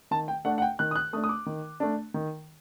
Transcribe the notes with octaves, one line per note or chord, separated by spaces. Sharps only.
D#3 A5
G5
A3 D4 F#5
F#5
G5
D#3 F#6
D#6
F#6
A3 D4 D#6
D#6
D6
D#3
A3 D4
D#3